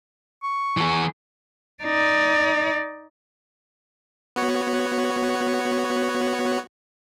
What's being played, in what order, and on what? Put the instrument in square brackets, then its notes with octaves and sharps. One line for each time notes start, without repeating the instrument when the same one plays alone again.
[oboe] C#6
[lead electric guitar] E3 G#4
[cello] D#4 D5
[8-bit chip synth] B3 F#4 C#5